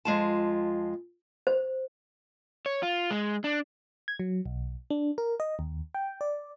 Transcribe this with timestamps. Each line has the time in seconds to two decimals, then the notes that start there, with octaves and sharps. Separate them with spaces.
0.05 F2 G#3 F4 A5
1.47 C5
2.66 C#5
2.83 F4
3.11 G#3
3.44 D4
4.08 G#6
4.19 F#3
4.46 B1
4.90 D4
5.18 A#4
5.40 D#5
5.59 D#2
5.95 G5
6.21 D5